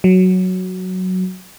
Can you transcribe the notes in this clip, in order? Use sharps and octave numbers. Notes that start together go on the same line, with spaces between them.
F#3